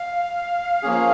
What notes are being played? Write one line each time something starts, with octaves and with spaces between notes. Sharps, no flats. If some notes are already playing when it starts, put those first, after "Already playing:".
Already playing: F5
F3 A#3 C#4 G#4